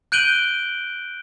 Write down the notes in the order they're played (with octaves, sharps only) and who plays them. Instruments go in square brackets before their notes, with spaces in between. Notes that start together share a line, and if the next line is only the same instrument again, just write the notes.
[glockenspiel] F#6 G6 D7 D#7 F#7 G7